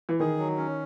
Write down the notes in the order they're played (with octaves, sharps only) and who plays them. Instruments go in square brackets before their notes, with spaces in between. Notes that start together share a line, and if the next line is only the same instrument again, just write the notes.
[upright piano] E3
[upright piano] D#3 [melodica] G#4
[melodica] F#3
C#4